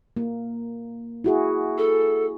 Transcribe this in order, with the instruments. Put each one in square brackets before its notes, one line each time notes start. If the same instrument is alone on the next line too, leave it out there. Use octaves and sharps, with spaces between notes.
[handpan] A#3
E4 F#4 G#4
[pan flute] A4